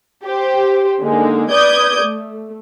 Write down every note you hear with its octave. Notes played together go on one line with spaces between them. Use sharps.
G4 C5
D3 G#3 A#3 D#4
B4 D5 D#6 G6 G#6
A3